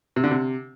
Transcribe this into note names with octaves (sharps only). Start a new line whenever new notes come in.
C3
D3
C3